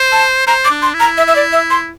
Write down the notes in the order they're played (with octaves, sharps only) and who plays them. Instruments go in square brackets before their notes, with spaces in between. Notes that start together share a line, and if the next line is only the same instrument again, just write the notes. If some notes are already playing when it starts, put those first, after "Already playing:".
Already playing: [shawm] C5
[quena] A5
[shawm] C5 [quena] A#5
[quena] D6
[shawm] D4
[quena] C6
[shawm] E4
[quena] A#5
E5
E5
D5
E5
C6